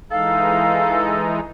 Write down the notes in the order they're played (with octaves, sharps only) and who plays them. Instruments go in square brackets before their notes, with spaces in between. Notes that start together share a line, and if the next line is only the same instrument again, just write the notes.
[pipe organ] E3 G#3 D#4 [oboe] A4 [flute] F5